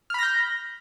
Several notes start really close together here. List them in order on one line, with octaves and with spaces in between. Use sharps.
F6 B5 A#6 G6